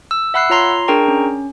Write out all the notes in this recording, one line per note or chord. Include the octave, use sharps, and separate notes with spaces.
E6
E5 F#5 B5 E6 F#6 C7
F4 C#5 A#5 C6 C7
D4 G#4 A#4 G5 A#5 C#6
C#4